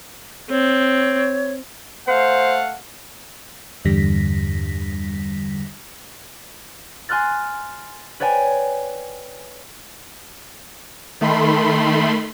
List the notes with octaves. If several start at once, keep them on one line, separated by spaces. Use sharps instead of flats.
C4 C#5
A3 C5 F5 F#5
E2 G2 D3 G3 A#6 B6
G#5 C6 F6 F#6 A6
B4 C#5 D5 G5 G#5
D#3 A3 B5 C6